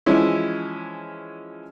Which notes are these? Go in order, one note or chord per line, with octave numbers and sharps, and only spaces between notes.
E3 F3 G#3 C#4 E4